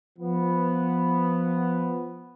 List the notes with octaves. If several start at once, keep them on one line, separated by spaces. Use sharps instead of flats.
F3 B3